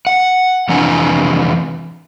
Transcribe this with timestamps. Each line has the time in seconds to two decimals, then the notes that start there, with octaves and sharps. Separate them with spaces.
0.07 F#5
0.69 F2 C3 E3 D4 G#5 A#5